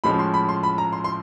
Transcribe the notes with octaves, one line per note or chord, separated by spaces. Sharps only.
A2 F3 G#3 C#4 B5
C6
B5
C6
B5
A#5
C6
C6